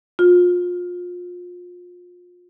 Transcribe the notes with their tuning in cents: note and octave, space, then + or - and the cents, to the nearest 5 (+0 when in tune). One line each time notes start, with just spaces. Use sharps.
F4 +30